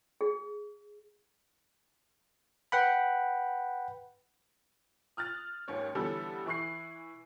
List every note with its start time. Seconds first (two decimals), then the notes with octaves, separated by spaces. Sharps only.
0.21 G#4
2.72 B4 F#5 G5 B5
5.17 D#6 F6 F#6 A6
5.68 D#2 G#2 C#4 C#5
5.95 D3 E3 G3 B3 C#4 A4
6.46 E3 E4 C#6 F#6 C7